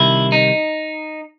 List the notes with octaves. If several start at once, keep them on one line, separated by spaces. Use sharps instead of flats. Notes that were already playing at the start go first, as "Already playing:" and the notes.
Already playing: C2 C3 D#3 E4
D#4